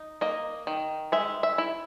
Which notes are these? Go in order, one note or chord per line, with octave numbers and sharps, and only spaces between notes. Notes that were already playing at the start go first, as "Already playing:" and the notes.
Already playing: D#4
A#3 D#5
D#3
G#3 E5
E5
E4